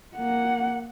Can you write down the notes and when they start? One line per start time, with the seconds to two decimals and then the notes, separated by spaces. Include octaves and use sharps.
0.16 A#3 F#5